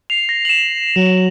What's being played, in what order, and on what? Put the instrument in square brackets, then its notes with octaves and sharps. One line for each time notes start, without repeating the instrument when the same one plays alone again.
[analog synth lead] C7 [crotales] F7
[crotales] A#6
E7 F#7
[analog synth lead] F#3